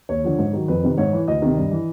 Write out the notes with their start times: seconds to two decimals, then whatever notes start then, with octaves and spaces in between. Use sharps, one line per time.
0.09 D#2 C#5
0.24 D3 F3
0.38 G#2
0.53 D#3 F#3
0.68 F2 B4
0.83 C3 D#3
0.98 G#2 C#5
1.13 E3
1.27 D2 D#5
1.42 C3 D#3
1.57 G2
1.72 E3